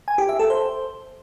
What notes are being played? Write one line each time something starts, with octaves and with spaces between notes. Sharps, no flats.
G#5
G4
E5
A4
C5